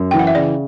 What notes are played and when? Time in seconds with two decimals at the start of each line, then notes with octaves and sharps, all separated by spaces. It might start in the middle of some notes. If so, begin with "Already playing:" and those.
Already playing: F#2
0.11 E3 G5
0.19 F#5
0.27 E5
0.35 C#3 D5